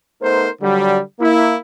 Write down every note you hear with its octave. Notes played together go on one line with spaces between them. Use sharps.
A3 B3 D#4 A#4 C5
D3 F#3 G3
A#3 E4